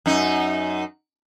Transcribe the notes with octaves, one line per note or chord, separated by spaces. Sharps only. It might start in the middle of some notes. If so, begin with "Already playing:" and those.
F#2 D#4